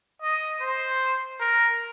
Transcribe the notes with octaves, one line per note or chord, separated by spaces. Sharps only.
D#5
C5
A#4